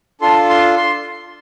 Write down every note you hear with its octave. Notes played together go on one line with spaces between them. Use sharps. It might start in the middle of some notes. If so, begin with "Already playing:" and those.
D4 F4 A4 C6
C6
C6